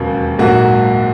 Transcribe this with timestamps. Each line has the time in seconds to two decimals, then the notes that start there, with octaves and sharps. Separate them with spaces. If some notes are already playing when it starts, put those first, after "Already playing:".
Already playing: E1 D#2 C#3 F#3 A#3
0.39 A#1 G#2 F#3 A#3 F#4